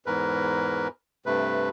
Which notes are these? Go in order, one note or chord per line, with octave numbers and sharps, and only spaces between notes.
E2 G#2 A#4 B4
G2 C3 A3 B4